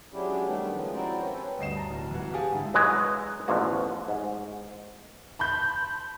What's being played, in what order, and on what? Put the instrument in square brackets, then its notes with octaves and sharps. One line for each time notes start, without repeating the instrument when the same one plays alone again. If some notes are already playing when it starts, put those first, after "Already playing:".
[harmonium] F#3 G#3 C#4 D4 E4 G4
D#3 G3 A3 B3 D4
C#3 F3 G#3
C4 E4 F#4 A#4 C5 D5
C#4 G4 A4 B4 C#5
[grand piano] D2 G2 D#5 C7 E7
A5 A#5
D1
E3 F#4
G4 G#4 F5 F#5 G#5 A5
G#2 D3 E4
[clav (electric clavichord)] E3 F#3 G#3 D#5 F#5 G#5
A1 E2 D3 F3 F#4
G#2
[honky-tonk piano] A5 B5 C6 G6